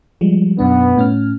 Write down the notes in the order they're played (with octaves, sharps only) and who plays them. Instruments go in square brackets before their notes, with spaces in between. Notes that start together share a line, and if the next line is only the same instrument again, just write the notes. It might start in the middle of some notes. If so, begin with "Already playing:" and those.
[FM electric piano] F3 G3 G#3
[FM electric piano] F#2 B2 D4 [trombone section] B3
[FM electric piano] A2 C#4 F6